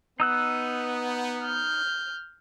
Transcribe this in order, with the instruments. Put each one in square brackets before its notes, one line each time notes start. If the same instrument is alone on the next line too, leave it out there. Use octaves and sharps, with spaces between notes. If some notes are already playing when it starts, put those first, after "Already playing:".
[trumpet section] B3 [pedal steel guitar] D#4 E6 F#6
[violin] F6 G6